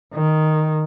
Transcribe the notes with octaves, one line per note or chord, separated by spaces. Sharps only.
D#3